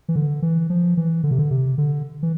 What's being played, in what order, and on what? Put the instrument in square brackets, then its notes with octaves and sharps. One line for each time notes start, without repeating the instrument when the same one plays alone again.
[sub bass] E3
D3
E3
F3
E3
D3
C3
D3
C3
D3
E3